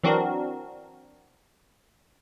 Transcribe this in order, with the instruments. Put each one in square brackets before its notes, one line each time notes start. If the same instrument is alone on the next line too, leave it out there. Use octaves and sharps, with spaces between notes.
[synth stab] E3 F#3 C4 D4 F#4 A#4